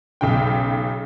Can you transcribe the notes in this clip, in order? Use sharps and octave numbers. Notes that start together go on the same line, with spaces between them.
B1 C#3 G5